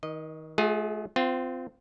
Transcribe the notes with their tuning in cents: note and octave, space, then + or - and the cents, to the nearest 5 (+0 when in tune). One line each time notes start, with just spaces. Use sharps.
D#3 +30 D#5 -10
A3 -40 F4 +35 G#4 +0
C4 -25 F4 +0